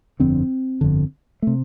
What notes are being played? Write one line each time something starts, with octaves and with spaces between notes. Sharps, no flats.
G1 F2 D3 C4
G1 F2 D3
C3 A3